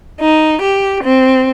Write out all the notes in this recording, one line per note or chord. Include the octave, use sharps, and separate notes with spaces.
D#4
G4
C4